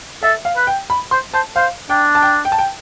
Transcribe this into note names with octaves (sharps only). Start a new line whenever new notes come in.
A4 E5
F5
B4
G5
B5
C5 C6
C5 A5
C5 F5
D4 G5
A5
G5
G5
A5
G5